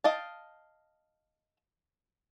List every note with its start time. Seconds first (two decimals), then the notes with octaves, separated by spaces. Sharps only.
0.04 D#5 F5 G5 A5